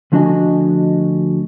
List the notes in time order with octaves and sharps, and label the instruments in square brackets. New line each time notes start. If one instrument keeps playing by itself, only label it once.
[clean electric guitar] D2 F3 D4 F#4 D#5 G#5